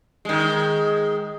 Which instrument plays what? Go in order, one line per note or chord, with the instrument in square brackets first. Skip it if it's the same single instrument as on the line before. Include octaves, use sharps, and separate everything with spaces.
[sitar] D#3 G#3